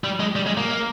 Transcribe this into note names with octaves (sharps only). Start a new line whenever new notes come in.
G3
G#3
G3
G#3
A#3